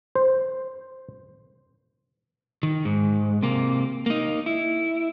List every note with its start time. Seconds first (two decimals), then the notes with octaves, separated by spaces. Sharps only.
0.15 C5
2.63 D#3
2.85 G#2
3.43 C3 A#3
4.06 A#3 D#4
4.46 E4